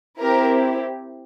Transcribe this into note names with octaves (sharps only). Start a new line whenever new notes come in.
C4 E4 G4 A#4